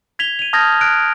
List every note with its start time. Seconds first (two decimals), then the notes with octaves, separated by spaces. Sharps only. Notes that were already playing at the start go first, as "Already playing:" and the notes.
0.19 G#6 B6 F7 G7
0.39 D#7 F7
0.53 A5 D#6 F6 G6 G#6 A#6
0.81 F6 F#6 D7